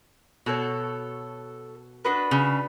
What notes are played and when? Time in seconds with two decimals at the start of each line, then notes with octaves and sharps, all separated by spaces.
0.46 B2 F#4 A4 C#5
2.05 D4 F#4 B4 D#5
2.31 C#3